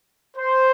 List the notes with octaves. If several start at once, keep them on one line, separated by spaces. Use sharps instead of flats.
C5